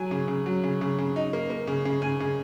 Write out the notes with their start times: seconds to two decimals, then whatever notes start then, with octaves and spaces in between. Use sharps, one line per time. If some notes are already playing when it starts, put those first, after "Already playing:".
Already playing: F#3 G#5
0.11 C#3
0.28 C#3
0.46 F#3
0.64 C#3
0.81 C#3
0.98 C#3
1.16 D#4
1.33 A#3
1.50 A#3
1.67 C#3
1.85 C#3
2.02 C#3 G#5
2.20 C#3